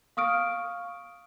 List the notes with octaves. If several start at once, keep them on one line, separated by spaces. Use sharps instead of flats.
F5 C#6 D#6 F6 D7